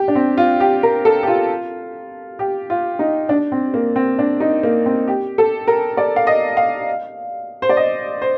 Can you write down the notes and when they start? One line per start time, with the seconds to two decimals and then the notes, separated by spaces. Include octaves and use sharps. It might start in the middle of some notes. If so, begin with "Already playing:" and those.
Already playing: G4
0.08 D4
0.15 C4
0.38 F4
0.60 G4
0.83 A#4
1.05 A4
1.23 G4
1.28 F4
2.39 G4
2.70 F4
2.99 D#4
3.29 D4
3.52 C4
3.74 A#3
3.96 C4
4.19 D4
4.40 D#4
4.63 A#3
4.86 C4
5.07 G4
5.38 A4
5.68 A#4
5.97 D5
6.16 F5
6.27 D#5
6.57 F5
7.62 C5
7.69 D5
7.77 D#5
8.22 C5